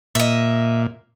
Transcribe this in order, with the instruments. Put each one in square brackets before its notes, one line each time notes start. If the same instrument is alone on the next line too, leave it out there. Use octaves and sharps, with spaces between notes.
[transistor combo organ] A#2 [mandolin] D#5 E5